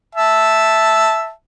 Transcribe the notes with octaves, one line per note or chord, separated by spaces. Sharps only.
E5 A5